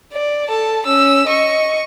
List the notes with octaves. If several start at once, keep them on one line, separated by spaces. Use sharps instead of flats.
D5
A4 A5
C#4 E6
D#5 C#6